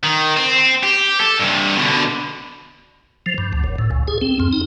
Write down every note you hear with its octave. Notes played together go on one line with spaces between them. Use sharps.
D#3
C4
G4
A4
G2 C3
B2 D3
F3
G2
D2
F#1
A2
C#2
G#4
C4
F2
D#4